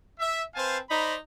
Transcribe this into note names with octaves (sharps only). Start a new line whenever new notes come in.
E5
C4 B4 C5 F5 G#5 A5
D#4 C5 D5 A#5 B5